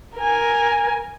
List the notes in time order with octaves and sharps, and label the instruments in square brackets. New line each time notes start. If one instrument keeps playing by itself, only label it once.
[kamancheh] A#4 G#5